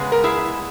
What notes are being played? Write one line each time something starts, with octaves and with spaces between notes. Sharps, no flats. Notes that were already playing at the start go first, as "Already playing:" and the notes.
Already playing: C#3 G#3 B3
A#4
E4 G#4